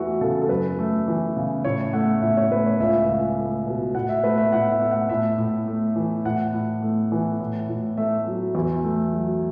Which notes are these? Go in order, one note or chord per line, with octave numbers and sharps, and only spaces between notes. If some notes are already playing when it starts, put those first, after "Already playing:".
Already playing: E2 E3 A3 F#4 E5
C#3 A4
A4
F#2 B4
A3
E3
C#3
A2 C#5
A3 F#5
A2 E5
C#5
A3 B4
C#5
C#2 E5
C#2
A3
B2
A2 F#5
E5
A3 B4
E5
A2 F#5
E5
A3
F#5
A2 E5
A2
A3
E3
A2 F#5
A2
A3
E3
A2
A2
A3 E5
F#3
E2
A3
F#3